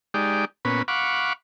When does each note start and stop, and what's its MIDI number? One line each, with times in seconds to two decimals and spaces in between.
0.14 0.45 56
0.14 0.45 63
0.14 0.45 67
0.14 0.45 74
0.65 0.82 46
0.65 0.82 59
0.65 0.82 61
0.65 0.82 71
0.88 1.33 77
0.88 1.33 78
0.88 1.33 83
0.88 1.33 85
0.88 1.33 86